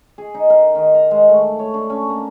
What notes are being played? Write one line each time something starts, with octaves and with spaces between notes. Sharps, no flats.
G#4
D#4
A#4
D#3
A#5
G#3
A3
C#5
D4
C#4
A#3